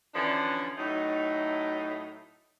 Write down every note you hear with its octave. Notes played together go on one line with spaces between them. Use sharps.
D3 E3 F3 C#4 D4
A2 F#3 A3 D#4